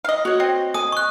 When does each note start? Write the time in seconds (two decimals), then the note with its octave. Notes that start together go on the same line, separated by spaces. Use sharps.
0.04 D#5 F5
0.25 F#4 C#5
0.40 C4 D#5
0.74 G#5 D#6
0.92 C#6 F#6